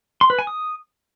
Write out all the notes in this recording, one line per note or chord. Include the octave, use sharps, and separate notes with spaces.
C6
B4
G#5
D#6